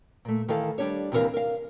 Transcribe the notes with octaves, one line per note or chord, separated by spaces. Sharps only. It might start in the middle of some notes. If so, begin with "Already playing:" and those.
A#2 A3
D#3 E3 E4 A4 F5
G3 D4 G4 C#5
D#2 C3 E3 D4 A#4 F5
A#4 F5